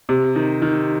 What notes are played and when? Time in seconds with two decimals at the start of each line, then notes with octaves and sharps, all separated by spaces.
0.09 C3
0.36 D#3
0.62 D#3